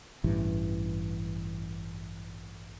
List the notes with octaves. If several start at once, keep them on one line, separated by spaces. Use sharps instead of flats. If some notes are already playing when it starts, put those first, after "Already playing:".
A1 G2 E3